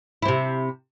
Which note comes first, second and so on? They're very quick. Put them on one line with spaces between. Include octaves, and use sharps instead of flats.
E4 C4 C3